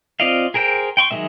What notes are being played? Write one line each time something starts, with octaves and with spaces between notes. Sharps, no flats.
C4 F4 D5 D#5 F5
G#4 A#4 C5 G5
G5 C6 C#6
D#3 F#3 G#3 A#3 E5